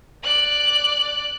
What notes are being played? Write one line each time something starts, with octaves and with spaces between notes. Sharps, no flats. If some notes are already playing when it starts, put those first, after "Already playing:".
D5 F#6